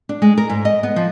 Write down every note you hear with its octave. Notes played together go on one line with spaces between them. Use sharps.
D4
G#3
A#4
G#2
D#5
B3
F3